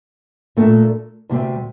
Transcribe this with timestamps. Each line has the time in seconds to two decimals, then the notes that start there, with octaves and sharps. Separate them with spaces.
0.57 A#2 A3 D4 A4
1.29 D2 C3 G3 C4